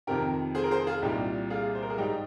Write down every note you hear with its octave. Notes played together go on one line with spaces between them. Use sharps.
F2 C3 D#3 G4 A#4
G#4 C5
A#4
G#4 C5
F4 G#4
C2 A#2 G3 D#4 G4
F4 G#4
C5
A#4
G#4
G#2 G3 D#4 G4